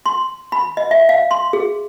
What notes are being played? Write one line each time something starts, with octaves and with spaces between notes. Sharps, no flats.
C6
B5
D#5
E5
F5
C6
G#4